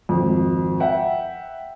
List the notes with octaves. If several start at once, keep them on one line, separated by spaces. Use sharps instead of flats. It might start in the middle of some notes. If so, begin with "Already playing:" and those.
G#1 F2
E5 F#5 G5